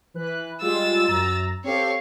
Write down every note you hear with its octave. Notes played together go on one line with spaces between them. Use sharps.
E3 B4 F#6
G3 G#3 F4 E6 A6
F#2 A#5
C4 G4 A4 C#5 F5